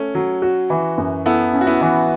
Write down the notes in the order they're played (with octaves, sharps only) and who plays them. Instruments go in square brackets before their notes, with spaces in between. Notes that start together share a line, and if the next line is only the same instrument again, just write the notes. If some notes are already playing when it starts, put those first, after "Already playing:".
Already playing: [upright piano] A3 [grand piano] C#4
[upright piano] F#3
F#4
E3
F#2
[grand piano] B3 E4 [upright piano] A4
[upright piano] C#4
[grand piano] F#4
B3 E4
[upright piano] E3